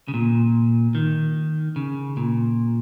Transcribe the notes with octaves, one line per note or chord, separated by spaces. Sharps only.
C#3
A#2
D#3
C#3
A#2